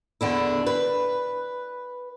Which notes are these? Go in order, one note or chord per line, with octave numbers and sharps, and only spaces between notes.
E2 D3 D4 E4
B4